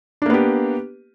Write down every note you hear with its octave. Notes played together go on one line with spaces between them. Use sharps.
A#3 B3 D4 G4